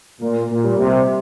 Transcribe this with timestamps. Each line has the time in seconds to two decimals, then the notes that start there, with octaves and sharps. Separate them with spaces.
0.21 A#2 A#3
0.50 A#2
0.64 G3
0.79 C3